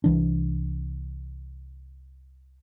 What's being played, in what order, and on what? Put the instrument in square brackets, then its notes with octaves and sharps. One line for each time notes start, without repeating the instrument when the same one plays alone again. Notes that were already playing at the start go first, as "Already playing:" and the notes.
[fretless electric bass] C2 E3 D4